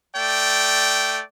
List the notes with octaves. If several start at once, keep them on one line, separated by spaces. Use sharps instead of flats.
A3 D5 G5